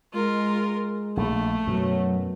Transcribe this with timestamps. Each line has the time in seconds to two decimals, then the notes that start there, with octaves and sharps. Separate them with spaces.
0.13 G#3 F4 A#4
1.17 A#1 A3
1.67 F#2 B2 F#3